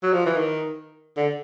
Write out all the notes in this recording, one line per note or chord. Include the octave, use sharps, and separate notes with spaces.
F#3
F3
E3
D#3
D3